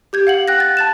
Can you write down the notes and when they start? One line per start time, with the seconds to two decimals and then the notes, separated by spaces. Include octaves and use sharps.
0.13 G4 G6 G#6
0.27 F5 F#5 F#7
0.48 G5 F#6 A#6
0.60 A6
0.77 A5 A6 E7